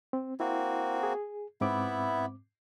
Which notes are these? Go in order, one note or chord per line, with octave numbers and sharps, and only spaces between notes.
C4
A#3 C4 E4 F#4
G#4
G#2 B3 C4 E4 E5 D6